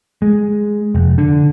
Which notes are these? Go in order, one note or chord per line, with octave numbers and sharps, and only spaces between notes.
G#3
F1
D3